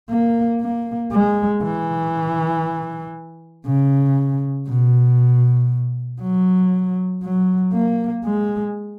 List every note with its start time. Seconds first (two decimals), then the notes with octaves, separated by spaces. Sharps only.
0.10 A#3
0.61 A#3
1.12 G#3
1.63 E3
3.66 C#3
4.68 B2
6.22 F#3
7.23 F#3
7.73 A#3
8.25 G#3